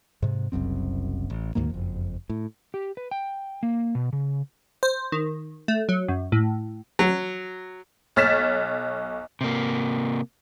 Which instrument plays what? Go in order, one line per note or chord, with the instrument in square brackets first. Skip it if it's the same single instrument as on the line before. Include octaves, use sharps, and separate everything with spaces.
[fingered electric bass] G#2 C3
F#1 C2 F#2 C4
A1
D2 G#2 D#3 A#3
F#1 F2
A2
[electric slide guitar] G4
B4
G5
A#3
B2
C#3
[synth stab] C5
D#3
A3
F#3
F#2
A2
[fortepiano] F#3
[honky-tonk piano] B1 C#5 F6 A6 B6 E7
[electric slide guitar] C3 A#3